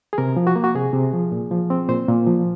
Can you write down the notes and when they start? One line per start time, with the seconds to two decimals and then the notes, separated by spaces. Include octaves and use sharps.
0.13 G#4
0.18 C3 A#4
0.37 F3
0.47 F#4
0.56 A#3
0.64 F#4
0.74 C3 G#4
0.93 C3
1.13 F3
1.32 A#2
1.51 F3
1.70 C4
1.89 A#2 C5
2.08 A#2
2.27 F3